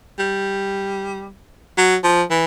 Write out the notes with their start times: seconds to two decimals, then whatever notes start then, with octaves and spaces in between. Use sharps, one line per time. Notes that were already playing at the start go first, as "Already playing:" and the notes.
0.19 G3
1.78 F#3
2.04 F3
2.30 E3